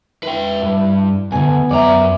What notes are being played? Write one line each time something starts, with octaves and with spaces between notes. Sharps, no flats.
E4 B4 G5
G2
D2 G#2 B3 G#5
F#2 D5 E5 A#5